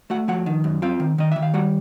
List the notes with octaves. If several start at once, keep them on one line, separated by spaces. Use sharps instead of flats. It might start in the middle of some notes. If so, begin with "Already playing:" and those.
A3 F#4 F#5
F3 F#4 F#5
D#3
F#2
C4 F4 F5
D#3
D#3 D#5
D#3 E5
F5
G3 F#4 F#5